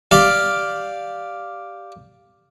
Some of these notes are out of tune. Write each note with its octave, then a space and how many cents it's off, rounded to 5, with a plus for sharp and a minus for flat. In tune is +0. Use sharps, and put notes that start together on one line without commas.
G4 +0 D5 +0 F5 +0